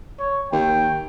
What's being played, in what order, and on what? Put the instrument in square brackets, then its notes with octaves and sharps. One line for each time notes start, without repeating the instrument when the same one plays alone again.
[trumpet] C#5
[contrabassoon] D#2 [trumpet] G5